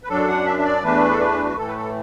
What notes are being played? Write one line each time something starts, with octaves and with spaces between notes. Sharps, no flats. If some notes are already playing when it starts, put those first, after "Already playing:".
B4
F#2 F#3 D4 A4
F#5
E5
E5
D5
E2 E3 A3 D4 B4
A4
B4
F#4
A2 E3 A3 A4
B4
A4